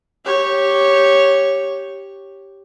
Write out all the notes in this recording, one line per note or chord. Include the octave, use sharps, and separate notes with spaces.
G4 C#5